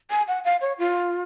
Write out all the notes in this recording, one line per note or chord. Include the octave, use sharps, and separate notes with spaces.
G#5
F#5
F5
C#5
F4